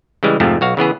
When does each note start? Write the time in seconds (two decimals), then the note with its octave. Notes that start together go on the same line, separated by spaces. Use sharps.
0.23 C#3 E3 G3 G#3
0.40 F2 G#2 C3 F3 A3
0.61 B1 F#4 F5
0.77 C#3 E3 B3 G#4